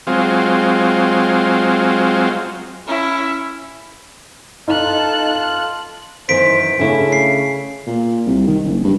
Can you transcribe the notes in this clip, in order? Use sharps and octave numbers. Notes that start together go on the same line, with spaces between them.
F#3 G#3 C4 F4
C#4 E4
D#4 F4 A4 F#6
F#2 D#3 E3 C5 B6 D7
C#3 A3 C#4 D4 E4
C7
A#2
C2
D#3
F#1
G2